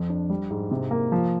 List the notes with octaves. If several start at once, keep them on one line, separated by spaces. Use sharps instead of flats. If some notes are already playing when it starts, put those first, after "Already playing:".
Already playing: F2
D4
G3
G#2
C3
A#3
F3